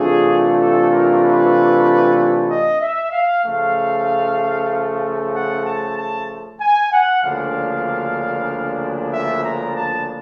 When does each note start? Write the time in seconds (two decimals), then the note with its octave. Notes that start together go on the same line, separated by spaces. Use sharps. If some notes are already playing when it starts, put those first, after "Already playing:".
Already playing: C3 E3 A3 D4 F4 G#4
0.59 A4
0.91 A#4
1.23 B4
2.49 D#5
2.80 E5
3.12 F5
3.44 C#3 F3 A3 F5
5.34 F#5
5.65 A5
5.98 A5
6.60 G#5
6.92 F#5
7.23 D2 C#3 F3 A#3 D4 F5
9.13 E5
9.45 A#5
9.76 A5